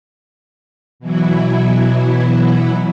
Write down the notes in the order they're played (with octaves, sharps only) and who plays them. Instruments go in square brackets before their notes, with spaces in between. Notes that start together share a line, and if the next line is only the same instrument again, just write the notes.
[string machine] B2 E3 F#3 E4